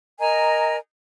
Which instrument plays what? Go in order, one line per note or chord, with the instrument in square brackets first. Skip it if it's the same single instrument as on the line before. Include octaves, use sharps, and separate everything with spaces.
[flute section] A#4 D#5 G#5 A#5